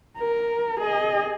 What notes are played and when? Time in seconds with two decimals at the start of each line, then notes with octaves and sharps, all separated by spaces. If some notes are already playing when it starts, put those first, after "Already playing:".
0.18 A#4
0.80 G#4 D#5